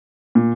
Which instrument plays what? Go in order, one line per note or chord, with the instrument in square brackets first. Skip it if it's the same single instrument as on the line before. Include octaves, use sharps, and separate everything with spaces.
[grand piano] A#2